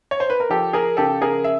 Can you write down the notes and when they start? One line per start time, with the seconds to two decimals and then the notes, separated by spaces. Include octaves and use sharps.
0.11 C#5
0.20 C5
0.30 B4
0.40 A#4
0.49 F3 G4 A4
0.73 G#4 A#4
0.97 C#3 G4 A4
1.22 G#4 A#4
1.44 E5